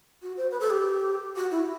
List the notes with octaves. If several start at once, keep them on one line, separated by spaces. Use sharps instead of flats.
F#4
C5
B4
A4
G4
F#4
E4